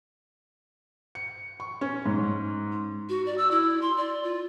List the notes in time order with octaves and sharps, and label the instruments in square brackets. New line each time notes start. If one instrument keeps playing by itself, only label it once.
[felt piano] C#7
C#6
C#4
G#2
[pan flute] F#4
D5
E6
E4
C6
D5
F4